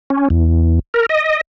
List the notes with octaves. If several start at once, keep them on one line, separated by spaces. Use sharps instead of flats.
C#4
E2
A#4
D#5